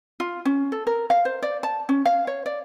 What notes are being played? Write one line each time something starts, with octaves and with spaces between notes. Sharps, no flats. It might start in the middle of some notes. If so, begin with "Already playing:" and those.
F4
C#4
A4
A#4
F5
C5
D5
A5
C#4
F5
C#5
D5